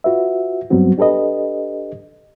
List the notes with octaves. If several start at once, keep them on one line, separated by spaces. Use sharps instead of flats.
F4 F#4 B4 E5
G2 F#3 G3 B3 C4 F#4
D4 G4 A4 B4 D#5